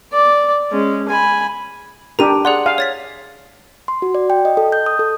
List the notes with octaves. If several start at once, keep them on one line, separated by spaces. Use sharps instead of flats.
D5
G#3 C#4
G#5 B5
D4 G4 A#4 A#5 D#7
G#4 D5 F#5 C6
F5 G#5
C#5 A6 B6
C6
F#4
D5
G5
D#5
A4
G6
D#6
A4